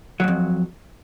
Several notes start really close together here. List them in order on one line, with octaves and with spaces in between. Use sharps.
F#3 G#2 F2